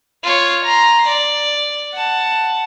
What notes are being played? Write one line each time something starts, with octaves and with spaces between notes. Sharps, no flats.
F4 C#5
A#5 C6
D5
F#5 A5